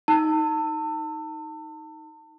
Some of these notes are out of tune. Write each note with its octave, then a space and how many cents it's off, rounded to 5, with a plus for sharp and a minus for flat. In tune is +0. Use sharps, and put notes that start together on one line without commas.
D#4 +15 A5 +35 E6 +0